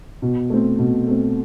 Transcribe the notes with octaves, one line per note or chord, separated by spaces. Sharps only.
B2
A3 C4
B2
A3 C4